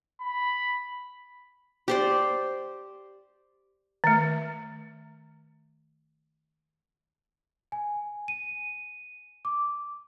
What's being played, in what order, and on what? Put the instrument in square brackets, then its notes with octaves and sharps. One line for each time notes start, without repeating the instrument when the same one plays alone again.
[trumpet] B5
[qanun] G4 C5 D5
[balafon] D#3 A3
[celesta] G#5
D#7
D6